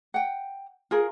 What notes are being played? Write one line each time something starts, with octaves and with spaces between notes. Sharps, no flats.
F#5 G5
F4 G#4 A#4